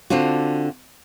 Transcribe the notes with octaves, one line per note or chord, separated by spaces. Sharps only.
D3 C4 D4 F4 F#4